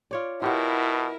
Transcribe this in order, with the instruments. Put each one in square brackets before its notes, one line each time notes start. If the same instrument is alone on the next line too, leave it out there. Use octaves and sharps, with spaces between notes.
[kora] F4 C#5 D5
[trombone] B2 [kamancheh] E4 A#4 [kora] F4 G4 F#5